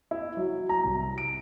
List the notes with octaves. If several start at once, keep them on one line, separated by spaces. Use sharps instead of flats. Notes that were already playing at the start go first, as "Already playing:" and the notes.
E4
F#3
A#5
C2
D7